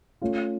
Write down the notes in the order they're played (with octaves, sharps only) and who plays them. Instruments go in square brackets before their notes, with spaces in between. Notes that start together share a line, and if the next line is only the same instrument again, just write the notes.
[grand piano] A3 C#4 F4